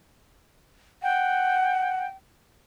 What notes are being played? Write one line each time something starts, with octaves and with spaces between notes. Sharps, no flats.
F#5 G5